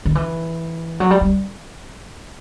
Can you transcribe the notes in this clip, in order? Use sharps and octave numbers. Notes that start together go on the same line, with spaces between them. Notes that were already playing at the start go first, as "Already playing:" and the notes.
D#3
E3
F#3
G3
G3